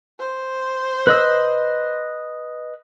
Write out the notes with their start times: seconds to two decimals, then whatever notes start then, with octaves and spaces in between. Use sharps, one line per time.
0.19 C5
1.07 B4 D#5 E6